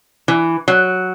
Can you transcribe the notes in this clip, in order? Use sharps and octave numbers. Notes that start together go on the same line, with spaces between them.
E3
F#3